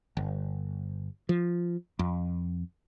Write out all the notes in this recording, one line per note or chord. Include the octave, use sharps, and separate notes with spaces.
G1
F3
F2